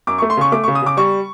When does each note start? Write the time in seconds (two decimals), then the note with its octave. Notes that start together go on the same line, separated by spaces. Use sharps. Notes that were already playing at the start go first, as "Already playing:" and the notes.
0.07 F#2 D6
0.18 A3 C#6
0.30 C6
0.37 C#3 C#6
0.52 A3 D6
0.64 C#3 C#6
0.75 D#6
0.82 C#3 D6
0.97 G3 C#6